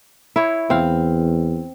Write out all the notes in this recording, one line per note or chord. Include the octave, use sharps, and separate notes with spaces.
E4 C#5
E2 C4 F5